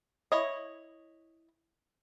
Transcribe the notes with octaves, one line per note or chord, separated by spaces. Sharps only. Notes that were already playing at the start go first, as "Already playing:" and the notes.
E4 C#5 D#5